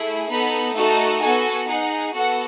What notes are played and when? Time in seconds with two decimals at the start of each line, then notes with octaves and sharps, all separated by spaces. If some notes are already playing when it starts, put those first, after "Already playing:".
Already playing: A3 E4 G#4
0.30 B3 D#4 A4 B5
0.75 A3 D#4 F#4 A4 A5
1.21 B3 F#4 A4 G#5
1.68 D#4 G#4 F#5
2.14 B3 F#4 A4 F#5